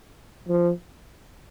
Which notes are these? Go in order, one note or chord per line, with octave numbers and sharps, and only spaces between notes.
F3